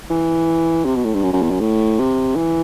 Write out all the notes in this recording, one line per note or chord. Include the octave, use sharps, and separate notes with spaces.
E3
C3
B2
A2
G2
F#2
F#2
E2
F#2
A2
C3
E3